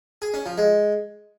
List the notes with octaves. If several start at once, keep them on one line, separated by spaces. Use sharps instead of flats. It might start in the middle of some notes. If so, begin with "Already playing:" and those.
G#4
C#4
F3
G#3